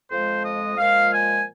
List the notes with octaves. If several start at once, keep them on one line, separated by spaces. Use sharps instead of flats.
F2 F3 G#3 C5
D#5
A#2 F3 G#3 F5
G#5